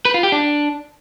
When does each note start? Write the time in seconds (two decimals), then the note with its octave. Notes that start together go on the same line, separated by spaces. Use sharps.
0.05 B4
0.14 F4
0.23 G4
0.32 D4